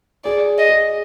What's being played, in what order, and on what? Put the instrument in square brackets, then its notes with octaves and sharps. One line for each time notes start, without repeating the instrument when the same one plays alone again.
[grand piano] G#4 [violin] D5
[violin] D#5
[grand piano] G#4